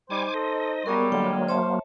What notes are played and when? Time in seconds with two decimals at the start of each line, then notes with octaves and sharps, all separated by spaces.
0.10 G3 D#4 C5 G#5 D6
0.34 A4 D#5
0.86 F#2 A#2 F#3 G3 B3 G#4 A#4
1.12 D3 F#3 G#3 A#3 G5
1.49 C5 C#5 E5 A5